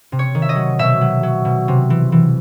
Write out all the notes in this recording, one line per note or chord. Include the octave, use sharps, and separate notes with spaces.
C3
C#5
D#3
E5
D#5
F#3
B2 E5
F#3
F#3
B2
C3
E3
E3